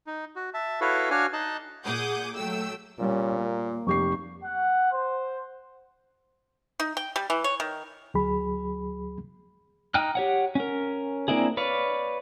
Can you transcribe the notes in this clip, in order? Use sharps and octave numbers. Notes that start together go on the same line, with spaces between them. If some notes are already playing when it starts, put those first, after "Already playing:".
D#4
F#4
E5 A5
E4 F#4 A4 B4 C#5 F5
D4 F#4 C#5 F5 G#5
D#4 D#5 A5 F#6
A#2 G#4 F#5 D6 D#6 G6
F#3 A3 G5 E6
A#2 G3 C#4
A#3
F1 G4 C#6 C7
F#5
C5
D#4
G5
G3
E3
C#5
D#3
D2 F#3 G#4 B5
D#4 G5 F6 F#6
G4 C#5 F#5
C#4 A#4
A#3 C4 D4 E4 G#4
B4 C#5 D5 F5